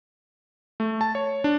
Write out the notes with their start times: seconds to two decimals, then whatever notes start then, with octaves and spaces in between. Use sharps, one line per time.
0.80 A3
1.01 A5
1.15 C#5
1.44 D4